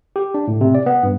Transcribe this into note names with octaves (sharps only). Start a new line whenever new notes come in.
G4
D4
A2
C3
D5
B3
G2